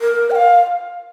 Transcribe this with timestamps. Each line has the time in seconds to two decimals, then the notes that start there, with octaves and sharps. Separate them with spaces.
0.01 A#4
0.31 G5
0.35 F5